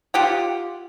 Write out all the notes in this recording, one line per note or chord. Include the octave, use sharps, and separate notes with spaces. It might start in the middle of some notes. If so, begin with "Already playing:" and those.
F4 G4 F#5